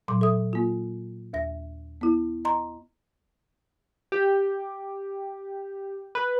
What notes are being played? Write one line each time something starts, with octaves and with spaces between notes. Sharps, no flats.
A#2 F#3 C6 D6
A4 E5 D#6
A#3 F4
D#2 E5 A#6
B3 E4
D#5 A#5 C6
G4
B4